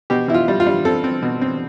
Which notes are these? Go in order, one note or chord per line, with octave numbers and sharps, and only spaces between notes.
B2 G4
B2 E4
F4
G3
F4
G3
C4 A4
C4
B2
C4